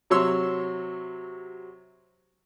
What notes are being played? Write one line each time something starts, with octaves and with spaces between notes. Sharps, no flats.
C3 F#3 C#5 C6 E6